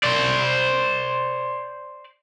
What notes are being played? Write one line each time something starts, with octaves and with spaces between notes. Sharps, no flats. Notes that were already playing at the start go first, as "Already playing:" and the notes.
C5 D5